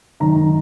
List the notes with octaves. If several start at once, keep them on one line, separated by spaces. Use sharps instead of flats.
G#1 F#2 D#3 A#5